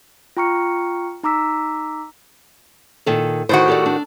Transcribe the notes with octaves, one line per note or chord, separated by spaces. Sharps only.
F4 G5 A#5 C#6 F6 C#7
D#4 A#5 D6 E6 B6
A#2 D#3 A4
A2 D#3 F#4 C5
G4 A4 D5
D4